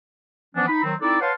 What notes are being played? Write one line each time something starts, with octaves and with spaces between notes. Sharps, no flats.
E3 F3 B3 C#4 D4
D#4 B5
D#3 F#3 C4
C4 D#4 E4 A4 D5
B4 C#5 F5 F#5 A5 C6